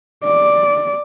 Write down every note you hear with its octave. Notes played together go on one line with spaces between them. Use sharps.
D5